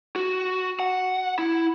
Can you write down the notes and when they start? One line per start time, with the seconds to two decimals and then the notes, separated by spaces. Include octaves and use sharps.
0.16 F#4
0.80 F#5
1.39 E4